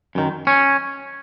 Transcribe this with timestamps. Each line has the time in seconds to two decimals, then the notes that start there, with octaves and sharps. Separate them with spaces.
0.15 F#2 D#3
0.47 C#4